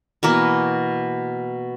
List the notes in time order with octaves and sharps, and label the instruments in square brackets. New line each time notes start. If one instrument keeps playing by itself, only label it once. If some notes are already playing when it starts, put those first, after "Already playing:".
[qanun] B2 E3 A#3